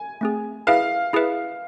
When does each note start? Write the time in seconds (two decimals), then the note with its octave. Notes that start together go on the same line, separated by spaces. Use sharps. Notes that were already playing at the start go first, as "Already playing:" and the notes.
Already playing: G#5
0.21 A3 C4 G#4
0.67 E4 G#4 B4 E5 F5
1.13 E4 G#4 B4 E5